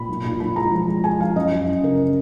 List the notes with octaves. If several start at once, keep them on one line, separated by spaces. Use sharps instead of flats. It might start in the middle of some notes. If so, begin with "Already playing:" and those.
Already playing: A#2 B5
B1
A#2
B1 B5
G#3 A#5
F3
G#3
G#3 G#5
F3 F5
F#2 D#5
F#2
F#2
C#3 A#4